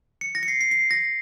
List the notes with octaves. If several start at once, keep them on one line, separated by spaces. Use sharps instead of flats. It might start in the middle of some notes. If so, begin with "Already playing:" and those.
C#7
A#6
C#7
C7
C7
C7
A#6